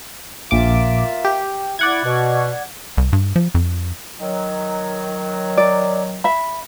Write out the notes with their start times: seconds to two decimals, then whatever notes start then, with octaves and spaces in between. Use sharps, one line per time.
0.51 A#1 A#3 F4 E5 D6
1.25 G4
1.79 E4 D5 F#5 G#6
2.04 B2
2.97 C2
3.13 G2
3.36 F3
3.55 F2
4.20 D#3 F#3
5.57 D5
6.24 E5 B5